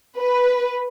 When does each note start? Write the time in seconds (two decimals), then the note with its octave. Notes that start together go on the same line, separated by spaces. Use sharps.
0.18 B4